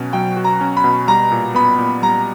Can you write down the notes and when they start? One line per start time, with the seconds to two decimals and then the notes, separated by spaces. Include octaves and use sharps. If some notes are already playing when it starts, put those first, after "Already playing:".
Already playing: B2 F#3 C#4 F#4
0.13 F#3 G5
0.37 F#4
0.44 A#5
0.61 C#4
0.77 B5
0.84 B2
1.08 G3 A#5
1.32 A#2
1.55 B3 B5
1.79 A#2
2.02 G3 A#5